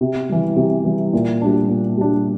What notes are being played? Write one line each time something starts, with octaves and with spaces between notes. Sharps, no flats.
C3
E3 G3
C3
E3 G3
A#2
G3 D4
A#2
G3 D4